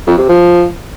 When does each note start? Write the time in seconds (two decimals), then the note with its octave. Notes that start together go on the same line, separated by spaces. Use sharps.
0.07 F2
0.18 C3
0.29 F3